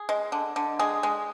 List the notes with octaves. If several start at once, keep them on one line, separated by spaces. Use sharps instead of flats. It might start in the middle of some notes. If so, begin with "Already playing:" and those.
Already playing: G#4
G#3
D3
D3
G#3 G#4
G#3